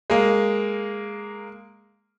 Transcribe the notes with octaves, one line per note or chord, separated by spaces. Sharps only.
G#3 A#3